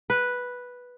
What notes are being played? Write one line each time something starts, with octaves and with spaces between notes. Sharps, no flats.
B4